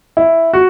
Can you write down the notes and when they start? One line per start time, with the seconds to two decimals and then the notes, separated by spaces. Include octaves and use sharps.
0.17 E4
0.53 F#4